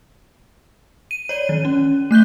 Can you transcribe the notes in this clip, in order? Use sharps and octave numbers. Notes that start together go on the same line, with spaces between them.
D#7
C#5 D5 D#7
D#3
C#4
A3 F#6 G6 G7